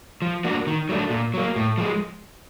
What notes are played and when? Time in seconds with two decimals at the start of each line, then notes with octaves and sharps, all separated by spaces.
0.22 F3
0.44 A#3 D4 F#4
0.67 D#3
0.89 F#3 A3 D4
1.10 A#2
1.34 F#3 A#3
1.56 A2
1.78 F3 G#3